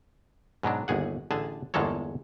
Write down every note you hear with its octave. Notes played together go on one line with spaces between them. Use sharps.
G#2 B2 F#3 D4
G1 D#2 G#4 F#5
A1 D3 G#4 A5
G1 E2 G#3 A#3 A4 C#5